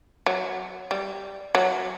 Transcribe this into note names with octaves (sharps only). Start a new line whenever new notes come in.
F#3
G3
F#3